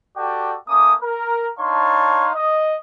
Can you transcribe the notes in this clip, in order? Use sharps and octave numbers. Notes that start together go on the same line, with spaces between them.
F#4 G4 A4 D5 G5
A3 A#3 C#4 D6 D#6
A#4
D4 D#4 C#5 F5 A5 C6
D#5